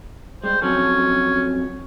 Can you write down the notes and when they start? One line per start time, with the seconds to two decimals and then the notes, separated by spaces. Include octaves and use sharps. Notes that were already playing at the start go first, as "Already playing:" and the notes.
0.44 G3 G#3 C5
0.62 F2 F#3 C#4 A4